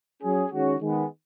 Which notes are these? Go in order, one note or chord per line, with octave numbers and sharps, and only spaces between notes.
F#3 C#4 G#4
D#3 G#3 C#4 F#4
D#3 G#3 B3